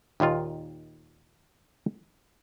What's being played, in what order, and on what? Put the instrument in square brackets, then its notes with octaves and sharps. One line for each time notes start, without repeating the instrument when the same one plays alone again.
[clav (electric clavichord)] D#2 A#2 D#3 F4